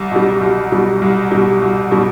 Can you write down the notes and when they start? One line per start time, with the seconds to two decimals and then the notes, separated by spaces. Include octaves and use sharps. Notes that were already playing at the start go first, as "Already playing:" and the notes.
Already playing: C2
0.11 B2 G3
0.41 C2
0.71 B2 G3
1.02 C2
1.31 B2 G3
1.61 C2
1.91 B2 G3